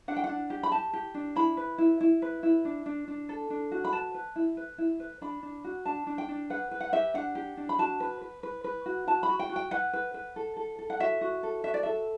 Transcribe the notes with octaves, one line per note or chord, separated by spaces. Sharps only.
D4 F#5
G5
F#5
D4
G4
B5
G4 A5
G4
D4
E4 B5
B4
E4
E4
B4
E4
D4
D4
D4
A4
D4
F#4
B5
B4 A5
B4
E4
B4
E4
B4
D4 B5
D4
F#4
D4 A5
D4
G5
D4
B4 F#5
B4
F#5
G4 E5
D4 F#5
G4
D4
B5
F#4 A5
B4
B4
B4
B4
F#4
F#4 A5
B5
F#4
G5
F#4
G5
B4 F#5
B4
B4
A4
A4
A4
F#5
F#4 E5
F#4
A4
F#4 E5
D5
A4 E5